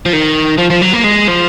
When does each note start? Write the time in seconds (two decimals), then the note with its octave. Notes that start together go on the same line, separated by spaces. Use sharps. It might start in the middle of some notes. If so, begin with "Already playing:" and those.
0.06 F3
0.13 D#3
0.58 F3
0.71 F3
0.82 F#3
0.93 A#3
1.04 G#3
1.28 F3